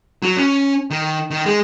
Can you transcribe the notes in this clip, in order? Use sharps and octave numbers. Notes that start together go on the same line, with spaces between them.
F#3
C#4
D#3
D#3
G#3